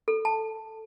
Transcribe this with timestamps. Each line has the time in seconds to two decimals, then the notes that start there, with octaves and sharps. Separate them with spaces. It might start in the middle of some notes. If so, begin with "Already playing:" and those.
0.08 A4
0.25 A5